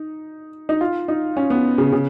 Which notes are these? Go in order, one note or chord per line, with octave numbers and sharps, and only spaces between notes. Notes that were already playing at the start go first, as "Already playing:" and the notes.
Already playing: D#4
D#4
F4
D#4
C#4
B3
C#3
C#3